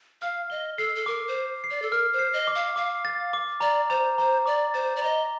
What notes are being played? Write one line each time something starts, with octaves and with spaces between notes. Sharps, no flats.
F5 F6
D#5 G7
A4 C7
A4
A#4 D6
C5
C7
C7
D5
A4
A#4 F6
C5
C7
D#5
D6
F5
F5 D6
A6
D6
D5 A#5
C5 A#5
C5 A#5
D5 D6
C5 A6
D5
D#5 A#5